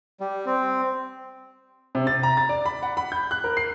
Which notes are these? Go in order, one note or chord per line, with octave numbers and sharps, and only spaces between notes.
G3
C4
C3
A6
A#5
A6
D5
B5
F#5
B5
G6
F#6
A#4
C7